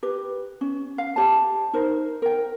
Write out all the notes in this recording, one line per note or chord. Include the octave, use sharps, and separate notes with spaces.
G4 B4
C#4
F5
G4 C#5 A5
D#4 A#4 C5
A#4 G5